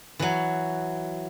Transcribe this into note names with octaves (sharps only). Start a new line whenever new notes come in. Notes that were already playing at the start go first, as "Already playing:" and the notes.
E3 F#3